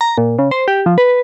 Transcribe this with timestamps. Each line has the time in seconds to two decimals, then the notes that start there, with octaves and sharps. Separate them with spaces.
0.01 A#5
0.18 A#2
0.39 C#3
0.51 C5
0.68 G4
0.86 F3
0.98 B4